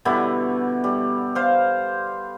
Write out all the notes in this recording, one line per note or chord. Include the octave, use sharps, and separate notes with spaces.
B2 D3 G3 E4
G3
C5 F5